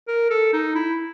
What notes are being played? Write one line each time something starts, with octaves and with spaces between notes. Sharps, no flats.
A#4
A4
D#4
E4